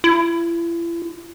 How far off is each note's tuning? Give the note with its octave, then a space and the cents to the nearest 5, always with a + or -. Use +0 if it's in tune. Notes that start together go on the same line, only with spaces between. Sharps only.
E4 +40